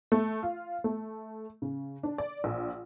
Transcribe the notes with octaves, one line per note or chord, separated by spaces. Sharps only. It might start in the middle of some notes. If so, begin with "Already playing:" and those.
A3
F4
A3
C#3
D4
D5
A#1